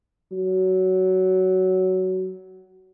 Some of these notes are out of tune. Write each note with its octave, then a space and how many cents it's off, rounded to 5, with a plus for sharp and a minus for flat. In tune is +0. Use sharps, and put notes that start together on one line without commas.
F#3 +15